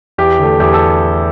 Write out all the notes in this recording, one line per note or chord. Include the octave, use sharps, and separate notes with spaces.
E2 G4
D3 A3
E2 G4
A4